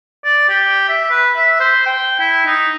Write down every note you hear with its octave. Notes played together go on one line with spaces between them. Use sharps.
D5
G4
E5
B4
E5
C5
G5
E4
D#4